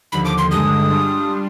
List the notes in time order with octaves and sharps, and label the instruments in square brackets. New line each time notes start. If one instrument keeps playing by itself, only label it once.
[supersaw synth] D#2 D3 F3 [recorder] B5
[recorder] D6
C6
[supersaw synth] G2 D3 G#3 [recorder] D#6
[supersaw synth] G3 D4 F4